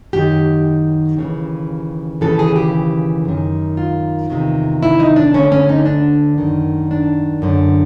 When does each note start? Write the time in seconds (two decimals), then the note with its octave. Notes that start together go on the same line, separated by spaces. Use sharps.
0.13 F#2 D#3 G4
1.17 D#2 C#3 E3
2.21 D#2 C#3 E3 A4
2.39 G#4
2.56 G4
3.25 F#2 D#3
3.77 F4
4.30 E2 C3 D#3
4.83 E4
5.00 D#4
5.16 D4
5.34 D2 D3 C#4
5.52 C#4
5.69 D#4
5.86 D4
6.38 F#2 D#3
6.91 D4
7.42 F#2 D3